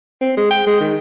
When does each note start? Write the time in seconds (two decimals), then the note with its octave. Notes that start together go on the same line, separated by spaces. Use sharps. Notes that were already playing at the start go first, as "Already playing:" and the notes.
0.21 C4
0.37 G#3
0.51 G5
0.67 G#3
0.81 D#3